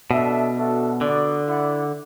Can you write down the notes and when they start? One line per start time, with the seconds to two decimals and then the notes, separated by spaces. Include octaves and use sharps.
0.11 B2 D4 A4 E5
0.56 D4 F#4 A4 E5
1.01 D3 B3 F#4 D5
1.46 E4 D5 F#5